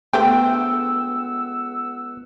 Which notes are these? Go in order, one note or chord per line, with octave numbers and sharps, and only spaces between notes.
C#2 D3 A3 B3 C5 F#5 G5 E6